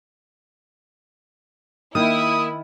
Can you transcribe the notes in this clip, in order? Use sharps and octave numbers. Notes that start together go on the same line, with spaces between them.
D#3 A#3 E4 D#6